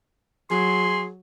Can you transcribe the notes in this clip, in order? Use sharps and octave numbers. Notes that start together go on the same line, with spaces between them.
F#3 G#4 C6